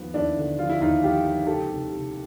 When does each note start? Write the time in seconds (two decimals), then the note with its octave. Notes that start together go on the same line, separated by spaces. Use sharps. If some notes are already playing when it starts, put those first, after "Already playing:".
Already playing: D#2 F3 B3
0.14 D#2 D4 E4
0.36 D3
0.59 F3 F4
0.69 E4
0.81 D#2 D#4 F4
1.03 F3 F4 G4
1.25 F3
1.46 C#2 G4 A4
1.69 C3
1.90 C3